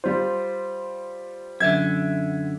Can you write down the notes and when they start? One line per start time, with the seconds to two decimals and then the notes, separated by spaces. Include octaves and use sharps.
0.04 G3 F4 C5
1.60 F#2 D3 E5 G#6